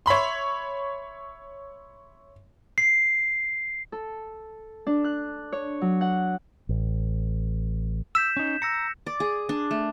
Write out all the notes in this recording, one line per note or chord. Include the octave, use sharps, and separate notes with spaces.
C#5 E5 B5 C6
C7
A4
D4
F#6
C#5
F#3
F#5
A1
E6 G6 B6 E7
C#4 D#4
A#5 E6 A#6 C#7
D5
G#4
D4
A3